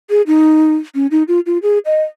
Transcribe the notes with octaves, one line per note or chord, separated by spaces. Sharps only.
G#4
D#4
C#4
D#4
F4
F4
G#4
D#5